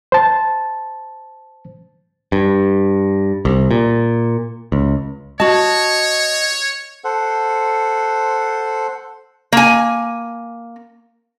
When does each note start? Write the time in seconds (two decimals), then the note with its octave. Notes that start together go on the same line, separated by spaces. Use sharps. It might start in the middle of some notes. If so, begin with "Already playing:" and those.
0.12 C5 A5
2.32 G2
3.45 C2
3.71 A#2
4.72 C#2
5.40 F#4 C#5 D#5 A5
7.04 A4 C5 F#5
9.52 A#3 G#5